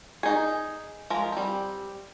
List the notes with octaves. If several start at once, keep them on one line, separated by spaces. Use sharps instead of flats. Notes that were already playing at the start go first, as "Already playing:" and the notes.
D#4 G#4
F3 G#3 A#4
G3 C4